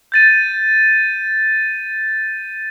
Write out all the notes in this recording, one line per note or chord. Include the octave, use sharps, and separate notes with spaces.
G6 A6 D#7